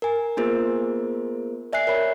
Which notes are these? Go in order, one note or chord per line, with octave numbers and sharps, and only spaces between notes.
A#4 G#5
A#3 B3 F4 G#4 A#4 C5
D5 E5 G#5 F#6 C7
A#4 C#5 B5